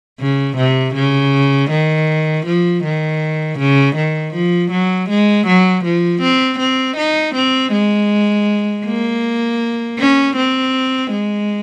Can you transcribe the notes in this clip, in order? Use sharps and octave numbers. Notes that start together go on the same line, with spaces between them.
C#3
C3
C#3
D#3
F3
D#3
C#3
D#3
F3
F#3
G#3
F#3
F3
C4
C4
D#4
C4
G#3
A#3
C#4
C4
G#3